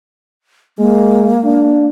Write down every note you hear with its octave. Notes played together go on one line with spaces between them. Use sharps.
G#3 A#3
D4